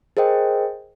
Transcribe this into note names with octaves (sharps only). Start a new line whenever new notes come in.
G#4 A#4 C5 D#5 G5